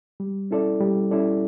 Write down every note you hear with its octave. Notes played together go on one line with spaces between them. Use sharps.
G3
C#4 E4 A4 D5
G3
C#4 E4 A4 D5